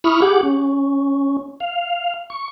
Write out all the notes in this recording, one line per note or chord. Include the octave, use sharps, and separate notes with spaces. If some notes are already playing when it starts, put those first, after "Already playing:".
E4 B5 C#6 D#6 F6
G4 G#4 F#5 D6
C#4
F5
C#6